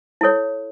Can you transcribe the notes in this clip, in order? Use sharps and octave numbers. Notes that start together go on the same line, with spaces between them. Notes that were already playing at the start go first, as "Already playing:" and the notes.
E4 A4 C#5